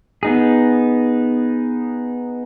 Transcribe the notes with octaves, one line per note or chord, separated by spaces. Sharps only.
B3 D#4 G#4